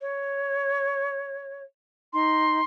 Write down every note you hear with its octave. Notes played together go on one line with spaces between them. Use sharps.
C#5
D#4 C6